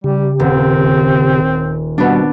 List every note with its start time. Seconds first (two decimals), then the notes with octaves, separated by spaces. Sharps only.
0.04 C#3 G3 G4
0.40 D#1 C4
1.98 B2 G3 B3 D4